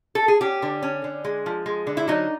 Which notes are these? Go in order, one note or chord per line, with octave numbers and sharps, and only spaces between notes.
A4
G#4
C#4 G4
D3
C#4
D3
G#3
F3
G#3
D3
E4
F#3 D#4